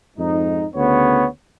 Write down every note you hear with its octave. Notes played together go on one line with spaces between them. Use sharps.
F2 G#2 D#4
D2 C#3 B3 C#5